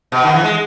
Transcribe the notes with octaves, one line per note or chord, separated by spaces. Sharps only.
B2
D#3
E3
G#3